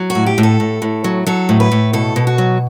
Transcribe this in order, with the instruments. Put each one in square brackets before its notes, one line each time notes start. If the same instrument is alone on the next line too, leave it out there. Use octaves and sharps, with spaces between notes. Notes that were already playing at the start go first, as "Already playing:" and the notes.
Already playing: [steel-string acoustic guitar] F#3
F#4
A2
G4
A2
A4
A2
A2
F#3
F#3 A4
A2
B4
A2
B2 A4
B2
F#4
F#3